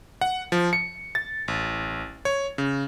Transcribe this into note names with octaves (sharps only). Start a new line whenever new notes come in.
F#5
F3
C#7
A6
A1
C#5
C#3